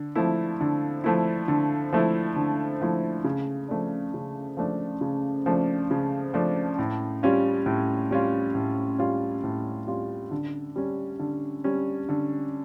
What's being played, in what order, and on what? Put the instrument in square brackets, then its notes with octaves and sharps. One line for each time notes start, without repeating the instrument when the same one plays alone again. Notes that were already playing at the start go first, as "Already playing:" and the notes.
Already playing: [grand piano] D3
F3 A3 E4
D3
F3 A3 E4
D3
F3 A3 E4
D3
F3 A3 E4
C#3
F3 A3 D4
C#3
F3 A3 D4
C#3
F3 A3 D4
C#3
F3 A3 D4
A2
G3 C#4 F4
A2
G3 C#4 F4
A2
G3 C#4 F4
A2
G3 C#4 F4
D3
G3 C#4
D3
G3 C#4
D3